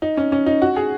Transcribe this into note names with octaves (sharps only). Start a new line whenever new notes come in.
D#4
C#4
C#4
D#4
F#4
G#4